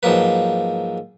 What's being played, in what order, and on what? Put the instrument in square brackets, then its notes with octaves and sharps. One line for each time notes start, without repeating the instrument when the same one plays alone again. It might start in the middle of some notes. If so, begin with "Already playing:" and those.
[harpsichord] G#2 F3 F#3 A#3 B4